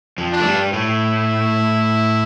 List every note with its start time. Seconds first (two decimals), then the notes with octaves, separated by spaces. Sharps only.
0.18 F2 F3
0.32 D4
0.40 A3
0.45 G2 G3
0.73 A2 A3 E4